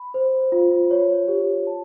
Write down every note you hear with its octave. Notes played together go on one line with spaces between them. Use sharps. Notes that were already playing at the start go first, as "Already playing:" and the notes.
Already playing: B5
C5
F4
C#5
G4
A5